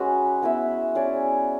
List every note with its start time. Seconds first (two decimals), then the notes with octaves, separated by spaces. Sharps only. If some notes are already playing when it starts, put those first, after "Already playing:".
Already playing: G#3 C#4 F#4 B4
0.42 B3 E4 B4 E5
0.95 C#4 G#4 D5